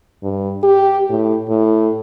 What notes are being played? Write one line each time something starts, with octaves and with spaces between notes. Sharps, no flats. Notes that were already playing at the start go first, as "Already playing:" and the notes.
G2
G4
A2
A2